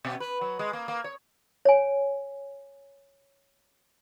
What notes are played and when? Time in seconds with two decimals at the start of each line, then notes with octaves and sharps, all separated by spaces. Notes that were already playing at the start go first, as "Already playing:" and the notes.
0.05 B2
0.20 B4
0.41 F#3
0.59 G#3
0.73 A#3
0.88 A#3
1.04 C#5
1.65 C#5 G#5